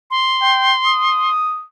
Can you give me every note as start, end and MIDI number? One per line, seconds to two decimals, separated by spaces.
0.11 1.30 84
0.42 0.73 79
0.87 1.64 87